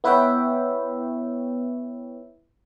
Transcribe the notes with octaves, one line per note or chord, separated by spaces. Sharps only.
B3 E4 B4 C#5 E5 G5